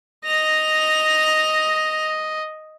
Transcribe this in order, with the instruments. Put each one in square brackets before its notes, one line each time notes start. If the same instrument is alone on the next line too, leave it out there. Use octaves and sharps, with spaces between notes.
[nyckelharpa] D#5 [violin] A#6 F7